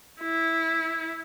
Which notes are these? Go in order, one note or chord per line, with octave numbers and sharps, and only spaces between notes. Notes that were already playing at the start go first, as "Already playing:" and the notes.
E4